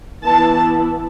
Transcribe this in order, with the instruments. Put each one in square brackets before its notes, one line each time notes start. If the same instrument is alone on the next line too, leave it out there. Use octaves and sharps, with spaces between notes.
[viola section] E3 B3 E4 A5